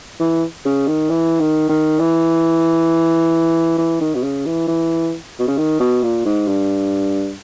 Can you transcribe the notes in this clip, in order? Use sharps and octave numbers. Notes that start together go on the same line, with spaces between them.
E3
C#3
D#3
E3
D#3
D#3
E3
E3
D#3
B2
C#3
E3
E3
B2
C#3
D#3
B2
A#2
G#2
G2